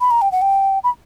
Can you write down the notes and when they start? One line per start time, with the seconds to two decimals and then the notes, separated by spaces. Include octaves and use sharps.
0.01 B5
0.11 A#5
0.22 G5
0.32 F#5
0.42 G5
0.84 B5